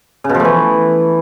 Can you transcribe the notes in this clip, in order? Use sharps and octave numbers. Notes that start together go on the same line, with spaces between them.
C#3
B2
F3
A3
E3